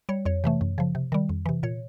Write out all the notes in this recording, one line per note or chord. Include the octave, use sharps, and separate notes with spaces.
G3 C#5
F2 C#5
C3 E3 A3
F#2
C#3 F3
C3
D#3 G3
F2
C3 E3
A#2 C#5